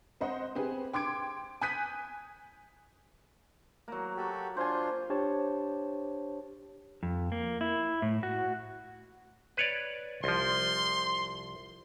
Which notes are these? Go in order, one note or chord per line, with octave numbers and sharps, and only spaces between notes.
C4 C5 D#5 F#5
C4 G4 G#4 B4
G5 C6 D6 G#6 D7
G#5 D#6 F#6 G6 B6 D#7
F#3 A#3
F#4 G4 A4
D4 F4 C5 G#5
D4 G4 C5 C#5 A5
F2
A#3
E4
A2
F#4
B4 C#5 D5
C2 F3 C6